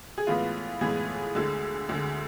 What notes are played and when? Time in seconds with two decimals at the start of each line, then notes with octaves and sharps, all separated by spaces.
0.18 G#4
0.27 A2 E3 G#3 B3 F4
0.81 A2 E3 G#3 B3 G#4
1.35 D2 D3 G#3
1.89 D2 D3 G#3